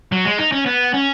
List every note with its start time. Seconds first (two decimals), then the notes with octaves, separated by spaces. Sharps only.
0.12 F#3
0.25 G#3
0.38 D#4
0.52 C#4
0.66 B3
0.94 C#4